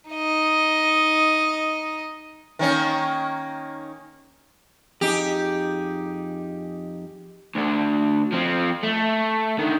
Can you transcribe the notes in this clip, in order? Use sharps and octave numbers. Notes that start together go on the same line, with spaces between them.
D#4 D#5
D#3 A#3 C#4
F2 D#4 G4 G#4
D2 D3
F3 C4
A3
D3 D#3